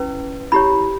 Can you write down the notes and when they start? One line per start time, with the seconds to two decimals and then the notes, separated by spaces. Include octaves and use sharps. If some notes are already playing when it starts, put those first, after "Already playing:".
Already playing: C#4 E4 B4
0.52 E4 G4 C#5 B5